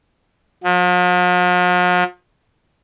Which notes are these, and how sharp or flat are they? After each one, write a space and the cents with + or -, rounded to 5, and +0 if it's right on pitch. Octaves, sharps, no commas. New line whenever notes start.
F3 +45